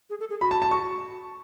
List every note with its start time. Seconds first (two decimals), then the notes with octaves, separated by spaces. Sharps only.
0.10 G#4
0.20 A4
0.30 G#4
0.41 F#4 B5
0.51 A5
0.62 A5
0.71 C#6